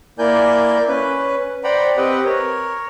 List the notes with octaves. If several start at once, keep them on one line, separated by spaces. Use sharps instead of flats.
A#3 E4 A#4 D5 G#5 G6
C#4 B4
C5 D5 F#5 G5 A#5 B5
C4 G4 B4 D#5 F#5 G5
A#4 C#5